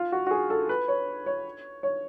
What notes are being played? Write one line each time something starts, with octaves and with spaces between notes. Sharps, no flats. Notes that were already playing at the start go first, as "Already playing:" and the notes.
Already playing: F4
F#4
F#4
G#4
A4
B4
C#5
C#5
C#5